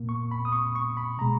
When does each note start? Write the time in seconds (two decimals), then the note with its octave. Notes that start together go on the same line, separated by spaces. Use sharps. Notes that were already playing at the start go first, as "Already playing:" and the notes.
Already playing: A#2 A#3
0.09 C#6
0.31 B5
0.45 D#6
0.52 C#6
0.75 C#6
0.97 B5
1.18 B2 G#3 A#5